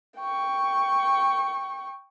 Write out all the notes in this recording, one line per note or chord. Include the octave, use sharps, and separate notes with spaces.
G5 C#6